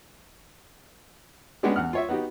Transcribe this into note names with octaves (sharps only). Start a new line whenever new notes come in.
G3 G#3 B3 C#4 D4 G4
E2 F#5 F6
F4 C#5 E5
B3 D#4 F#4 G4